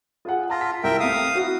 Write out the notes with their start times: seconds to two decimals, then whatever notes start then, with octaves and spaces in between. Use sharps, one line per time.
0.25 F4 G#4 F#5
0.50 F4 A5 A#6
0.61 B6
0.84 C2 A#4 E5 G5
1.00 A3 C4 F5 D#6
1.35 E4 F#4